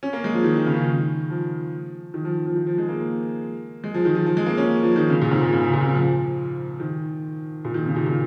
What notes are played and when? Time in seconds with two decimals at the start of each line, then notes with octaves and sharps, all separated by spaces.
0.03 C#4
0.13 A#3
0.24 G#3
0.34 F3
0.44 D#3
0.56 D#3
0.67 C#3
0.76 D#3
1.30 F3
2.14 D#3
2.25 F3
2.46 F3
2.56 D#3
2.66 F3
2.78 G#3
2.89 A#3
3.84 G#3
3.94 F3
4.05 D#3
4.15 F3
4.26 F3
4.37 G#3
4.46 A#3
4.58 C#4
4.83 F3
4.96 D#3
5.10 C#3
5.22 A#2
5.31 G#2
5.42 A#2
5.53 C#3
5.63 C#3
5.73 A#2
5.85 C#3
5.95 F3
6.80 D#3
7.65 A#2
7.74 D#3
7.86 C#3
7.96 A#2
8.06 A#2